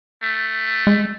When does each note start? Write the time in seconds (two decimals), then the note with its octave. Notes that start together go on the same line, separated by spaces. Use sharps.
0.23 A3
0.87 G#3